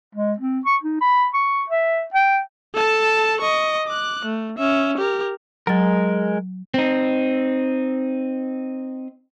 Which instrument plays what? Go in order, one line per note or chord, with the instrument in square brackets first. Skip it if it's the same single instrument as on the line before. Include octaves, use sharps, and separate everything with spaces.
[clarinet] G#3
C4
C#6
D#4
B5
C#6
E5
G5
[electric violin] A4 A5
D#5 C#6
D6 F#6
A3
C#4 E5
G4 A#4
[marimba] F#3 A6 [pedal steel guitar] G#3 A#4
[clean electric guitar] C4 D#4